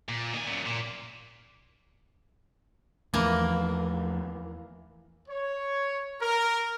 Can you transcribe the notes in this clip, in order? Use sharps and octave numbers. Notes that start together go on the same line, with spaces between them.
A#2
D#3 G#5
F#2 A#2
A#2
E2 E3 F3 A3 A#3
C#5
A#4